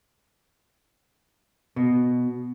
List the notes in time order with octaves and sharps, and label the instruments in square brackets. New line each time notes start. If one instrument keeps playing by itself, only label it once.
[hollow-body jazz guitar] B2